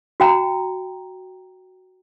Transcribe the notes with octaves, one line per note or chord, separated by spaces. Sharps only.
F#4 G5 A#5